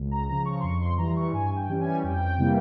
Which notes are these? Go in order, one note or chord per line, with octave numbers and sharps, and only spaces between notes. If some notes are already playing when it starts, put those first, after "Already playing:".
Already playing: C#2
A#5
C#3 F3 A#5
C#6
C6
F2 C#6
C6
E3 G3 A#5
C#6
G2 G#5
G5
E3 G3 C#4
G#5
F2 G5
C3 E3 G3 A#3